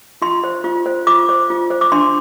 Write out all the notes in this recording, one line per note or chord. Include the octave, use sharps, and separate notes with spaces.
F4 C6
C5
F4
C5
F4 D6
C5
F4
C5
D6
D4 C6